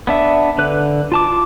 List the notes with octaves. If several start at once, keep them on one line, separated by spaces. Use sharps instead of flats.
B3 D4 E5
D3 B4 F#6
F4 A5 D6